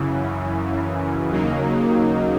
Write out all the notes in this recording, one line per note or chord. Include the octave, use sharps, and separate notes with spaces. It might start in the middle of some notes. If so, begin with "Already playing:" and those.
Already playing: F#2 C#3 E3
D#2 C#3 F#3 A#3 D#4